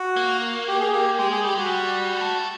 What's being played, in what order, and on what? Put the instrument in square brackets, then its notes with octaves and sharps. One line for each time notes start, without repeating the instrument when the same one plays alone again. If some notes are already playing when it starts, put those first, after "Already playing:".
Already playing: [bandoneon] F#4
[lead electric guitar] A#3
[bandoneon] G4
G#4
G4
[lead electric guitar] G#3 [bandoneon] G4
[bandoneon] G#4
[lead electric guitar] G3 [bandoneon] G4
[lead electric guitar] G#3 [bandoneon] F#4
[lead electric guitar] G3
A3